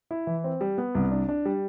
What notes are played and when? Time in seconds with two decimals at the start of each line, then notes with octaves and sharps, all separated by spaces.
0.11 E4
0.27 E3
0.44 C4
0.61 G3
0.78 B3
0.95 C2
1.12 D4
1.29 D4
1.45 G3